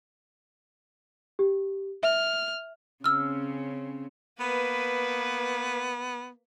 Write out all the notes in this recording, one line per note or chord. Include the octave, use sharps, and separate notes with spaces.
G4
E5 F6
C#3 C4 C#4 E6 F6
A#3 B3 B4